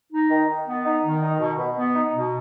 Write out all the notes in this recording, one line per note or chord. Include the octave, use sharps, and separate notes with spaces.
D#4
D#3
D#3
B3
D#4
D#3
D#4
B2
B2
B3
D#4
B2